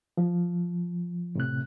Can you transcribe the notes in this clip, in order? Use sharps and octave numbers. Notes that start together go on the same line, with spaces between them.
F3
A2 C3 F#6